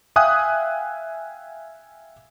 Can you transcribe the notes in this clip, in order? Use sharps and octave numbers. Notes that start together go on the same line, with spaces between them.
E5 F5 G5 G#5 D#6 F#6